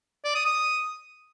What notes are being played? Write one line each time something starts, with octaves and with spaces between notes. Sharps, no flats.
D5
D#6
D#6